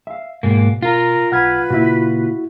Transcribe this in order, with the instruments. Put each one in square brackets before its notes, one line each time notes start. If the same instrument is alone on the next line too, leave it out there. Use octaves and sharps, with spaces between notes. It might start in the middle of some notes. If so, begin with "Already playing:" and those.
[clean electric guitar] E5 F5
[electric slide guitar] G#2 A#3 [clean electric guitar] B2
[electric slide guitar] F4 [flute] A#4
[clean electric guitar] B1 B5 [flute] B4 [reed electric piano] F#5 F6 G#6
[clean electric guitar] A#2 C#3 A#3 [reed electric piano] E4 F#4